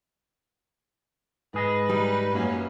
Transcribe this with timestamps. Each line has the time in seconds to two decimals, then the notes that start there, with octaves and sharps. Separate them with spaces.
1.54 G#2 G#4 B4 D#5
1.89 G3 D#4
2.33 F#2 A#3 C#4